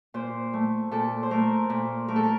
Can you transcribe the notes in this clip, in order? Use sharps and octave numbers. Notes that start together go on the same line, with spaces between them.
A#2 C5
A3
A#2 A4
C5
A3 A#4
A#2
A3 A#4
A4
A#4